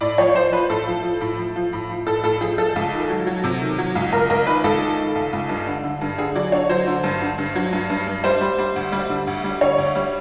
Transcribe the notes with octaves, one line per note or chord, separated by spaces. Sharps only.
A2 D5
F3 C#5
F3 C5
F3 B4
A2 A4
F3
F3
A2
F3
F3
A2
F3
A2 A4
A2 A4
F3 G#4
F3 A4
C#2
D#3
F#3
F#3
C3
D#3
F#3
C#2
C#2 A#4
C#2 A#4
D#3 B4
C#2 A4
D#3
D#3
C#2
C#2
G2
D3
D3
G2
D3 G#4
F#3 D5
D3 C#5
F#3 C5
D3
G2
D3
G2
F#3
G2
G2
G2
G3 C5
G3
G3
D2
G3
D3
D2
G3
D3 C#5
D2
G3